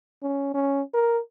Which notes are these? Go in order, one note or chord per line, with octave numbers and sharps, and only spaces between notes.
C#4
C#4
A#4